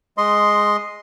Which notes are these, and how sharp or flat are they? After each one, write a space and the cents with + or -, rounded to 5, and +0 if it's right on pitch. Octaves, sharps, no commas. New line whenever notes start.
G#3 +0 D#5 +0 C6 +0